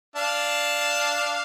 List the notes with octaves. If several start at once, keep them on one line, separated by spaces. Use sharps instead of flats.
D4 F5 A5